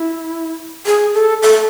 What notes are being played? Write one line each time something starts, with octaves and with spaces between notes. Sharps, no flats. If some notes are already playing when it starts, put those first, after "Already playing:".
Already playing: E4
G#4
A4
A4